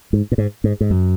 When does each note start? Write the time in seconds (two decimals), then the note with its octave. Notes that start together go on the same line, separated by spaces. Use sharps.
0.13 G#2
0.32 A#2
0.38 G#2
0.64 G#2
0.81 G#2
0.90 F#2